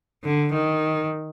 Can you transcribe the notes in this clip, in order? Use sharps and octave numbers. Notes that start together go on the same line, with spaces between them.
D3
D#3